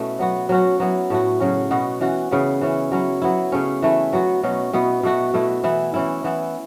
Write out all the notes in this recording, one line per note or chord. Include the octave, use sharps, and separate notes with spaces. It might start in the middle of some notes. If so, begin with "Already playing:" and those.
Already playing: B2 A3 C#4 E4
F#3 B3 F#4
F#3 C#4 F#4
F#3 B3 E4
A2 A3 F#4
C#3 F#3 C#4
B2 B3 F#4
E3 C#4 F#4
C#3 E3 B3
E3 C#4 E4
F#3 C#4 E4
F#3 B3 E4
C#3 A3 C#4
E3 A3 E4
F#3 B3 F#4
B2 F#3 C#4
B2 B3 E4
B2 A3 F#4
B2 A3 E4
E3 B3 E4
E3 C#4 E4
E3 B3 E4